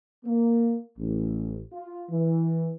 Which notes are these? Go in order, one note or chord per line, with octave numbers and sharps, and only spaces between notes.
A#3
A1
F4
E3